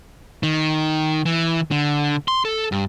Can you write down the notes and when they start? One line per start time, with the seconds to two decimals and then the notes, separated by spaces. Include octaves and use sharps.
0.43 D#3
1.26 E3
1.71 D3
2.28 C6
2.45 A4
2.72 G2